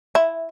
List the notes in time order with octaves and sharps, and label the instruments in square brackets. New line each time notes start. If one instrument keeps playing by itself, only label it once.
[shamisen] E4